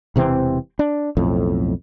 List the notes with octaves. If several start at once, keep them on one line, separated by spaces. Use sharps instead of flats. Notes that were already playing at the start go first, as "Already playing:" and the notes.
E1 C3 E3 C4
D4
B1 F2 A2